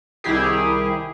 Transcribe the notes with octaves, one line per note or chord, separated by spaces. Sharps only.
C2 D#3 E4 G4 G#4